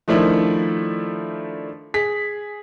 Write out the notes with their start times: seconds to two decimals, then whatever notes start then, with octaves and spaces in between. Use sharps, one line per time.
0.08 D#3 F3 A3 D4 E4
1.94 G#4 B6